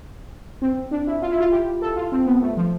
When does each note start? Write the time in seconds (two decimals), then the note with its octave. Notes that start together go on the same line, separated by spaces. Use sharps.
0.62 C4
0.91 D4
1.07 E4
1.22 F4
1.31 E4
1.40 F4
1.52 G4
1.82 A4
1.96 F4
2.12 C4
2.26 B3
2.42 A3
2.57 F3